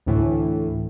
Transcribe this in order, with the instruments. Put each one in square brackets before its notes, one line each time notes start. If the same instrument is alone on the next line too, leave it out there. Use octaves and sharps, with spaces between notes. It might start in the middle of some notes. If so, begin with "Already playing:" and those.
[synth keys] D2 A2 E3